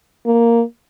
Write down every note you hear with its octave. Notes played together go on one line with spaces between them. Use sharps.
A#3